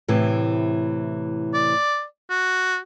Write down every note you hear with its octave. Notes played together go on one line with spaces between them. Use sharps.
A2 C3 E3
D5
F#4